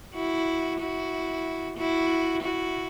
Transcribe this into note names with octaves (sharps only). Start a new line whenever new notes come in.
E4 F#4
E4 F#4
E4 F#4
E4 F#4